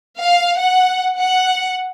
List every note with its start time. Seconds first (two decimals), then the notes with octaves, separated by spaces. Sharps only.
0.19 F5
0.57 F#5
1.18 F#5